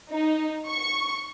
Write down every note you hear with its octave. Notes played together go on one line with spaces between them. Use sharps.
D#4
C#6